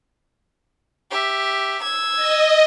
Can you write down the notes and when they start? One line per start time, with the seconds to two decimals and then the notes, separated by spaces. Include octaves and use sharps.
1.11 G4 E5
1.83 E6 G#6
2.16 D#5